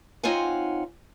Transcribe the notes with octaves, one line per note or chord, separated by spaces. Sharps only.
C4 D#4 F4 C#5 F#5 G#5